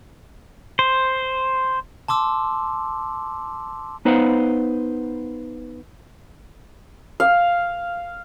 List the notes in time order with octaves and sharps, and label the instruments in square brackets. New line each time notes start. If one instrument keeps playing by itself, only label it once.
[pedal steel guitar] C5
[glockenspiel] A5 C6 D6 E6
[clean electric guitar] B3 D#4 B4 C5 F5 F#5
[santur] F5